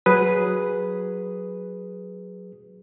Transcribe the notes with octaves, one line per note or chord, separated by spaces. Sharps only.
F#3 G#4 B4 D#6